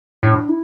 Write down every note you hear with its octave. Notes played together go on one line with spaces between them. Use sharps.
A2 D4
E4